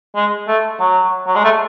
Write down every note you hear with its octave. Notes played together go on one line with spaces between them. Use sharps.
G#3
A3
F#3
F#3
G#3
A3